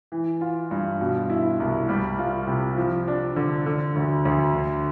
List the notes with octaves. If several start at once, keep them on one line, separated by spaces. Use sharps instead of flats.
E3
F4
G2
B2
E4
C2
G3
F4
C3
F3
D4
D3
D3
D2
D2
D3